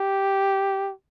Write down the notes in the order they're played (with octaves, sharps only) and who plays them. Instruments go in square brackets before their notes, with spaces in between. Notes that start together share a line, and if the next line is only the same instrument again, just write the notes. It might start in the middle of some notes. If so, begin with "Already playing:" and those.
Already playing: [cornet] G4